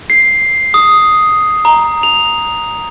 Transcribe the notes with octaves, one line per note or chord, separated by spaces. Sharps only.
C7
D#6
A#5
F7